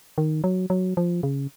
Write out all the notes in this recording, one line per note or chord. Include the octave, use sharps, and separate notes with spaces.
D#3
F#3
F#3
F3
C#3